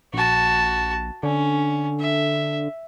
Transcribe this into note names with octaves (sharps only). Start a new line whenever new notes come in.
A#1 F#4 A5
D3 C#4
E5